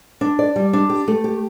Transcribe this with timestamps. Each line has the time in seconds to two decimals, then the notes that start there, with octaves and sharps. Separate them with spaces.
0.21 D4
0.39 D5
0.56 G3
0.73 D4
0.90 G4
1.08 A3
1.24 G4